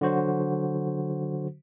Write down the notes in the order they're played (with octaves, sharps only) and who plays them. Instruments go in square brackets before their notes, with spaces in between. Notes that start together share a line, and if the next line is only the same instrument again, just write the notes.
[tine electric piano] D3 F#3 F#4 C5